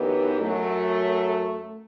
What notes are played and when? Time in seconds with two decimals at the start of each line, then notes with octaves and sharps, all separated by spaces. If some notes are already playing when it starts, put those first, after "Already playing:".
Already playing: F#2 E3 B3 D#4 G4
0.37 F#2 F#3 A3